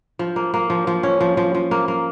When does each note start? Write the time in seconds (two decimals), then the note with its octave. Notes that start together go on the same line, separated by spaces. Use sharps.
0.19 F3
0.36 A#3
0.54 A#3
0.70 F3
0.87 F3
1.03 C#4
1.21 F3
1.37 F3
1.55 F3
1.71 A#3
1.88 A#3